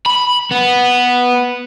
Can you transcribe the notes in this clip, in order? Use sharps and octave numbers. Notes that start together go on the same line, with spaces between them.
B5
B3